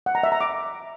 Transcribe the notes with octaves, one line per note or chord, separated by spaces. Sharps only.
F#5
A#5
E5
A#5
D6